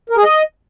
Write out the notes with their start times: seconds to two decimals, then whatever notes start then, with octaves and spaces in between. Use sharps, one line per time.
0.10 A#4
0.17 G#4
0.24 D#5